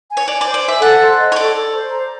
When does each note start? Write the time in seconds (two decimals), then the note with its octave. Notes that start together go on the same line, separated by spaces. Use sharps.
0.09 G#5
0.17 C#5
0.27 D5 G#5
0.41 D5
0.46 C5
0.54 D5
0.64 E5 G#5
0.82 A4 F#5
1.00 C5
1.18 D#5
1.32 C#5
1.36 A4 D5
1.55 A4
1.73 C5
1.91 A#5